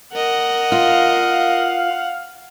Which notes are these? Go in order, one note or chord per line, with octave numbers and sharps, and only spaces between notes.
A#4 D#5 F#5
F4 F5